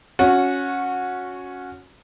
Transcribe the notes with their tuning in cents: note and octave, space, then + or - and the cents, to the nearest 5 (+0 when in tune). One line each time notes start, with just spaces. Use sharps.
C#4 +0 F#4 -20